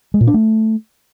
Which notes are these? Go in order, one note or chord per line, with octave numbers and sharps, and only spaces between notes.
G#3
A#2
D4
A3